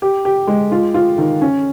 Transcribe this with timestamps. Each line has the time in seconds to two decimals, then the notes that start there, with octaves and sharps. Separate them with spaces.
0.02 G4
0.25 G4
0.47 G#3
0.72 F4
0.94 F4
1.18 D#3
1.41 C#4